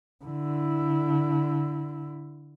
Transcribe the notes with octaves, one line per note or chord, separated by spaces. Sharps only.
D3 E4